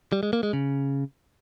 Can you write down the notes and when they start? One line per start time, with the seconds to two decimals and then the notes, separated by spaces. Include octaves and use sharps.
0.12 G3
0.23 G#3
0.33 A#3
0.43 G#3
0.53 C#3